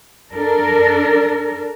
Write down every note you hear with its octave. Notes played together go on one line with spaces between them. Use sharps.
D4 A4 A#4